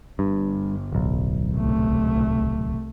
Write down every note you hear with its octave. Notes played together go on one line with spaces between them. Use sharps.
G1 G2
D1 B1
C2 A3